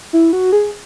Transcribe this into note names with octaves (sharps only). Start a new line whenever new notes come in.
E4
F#4
G#4